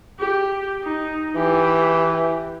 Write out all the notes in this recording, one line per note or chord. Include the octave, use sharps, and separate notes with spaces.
G4
D#4
E3 G4